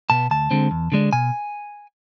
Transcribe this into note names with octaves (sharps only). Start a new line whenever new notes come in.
B2 B3 A5
D2 A5
D3 G#3 C4
E2
D3 G#3 D4
B2 G#5